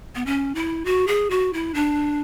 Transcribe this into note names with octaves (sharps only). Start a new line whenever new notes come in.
B3
C#4
E4
F#4
G#4
F#4
E4
D4